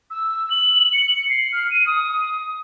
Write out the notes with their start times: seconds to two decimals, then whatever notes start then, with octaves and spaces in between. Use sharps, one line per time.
0.10 E6
0.50 F#7
0.92 C#7
1.29 C7
1.52 F6
1.70 D#7
1.86 D#6